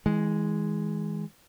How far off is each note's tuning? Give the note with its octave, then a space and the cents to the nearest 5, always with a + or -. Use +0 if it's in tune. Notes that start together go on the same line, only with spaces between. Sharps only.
E3 -35 G#3 +0